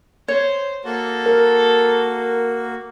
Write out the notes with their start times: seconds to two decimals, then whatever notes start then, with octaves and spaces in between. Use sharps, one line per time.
0.28 C5 C#5
0.85 A#3 F#4 A4
1.26 A#4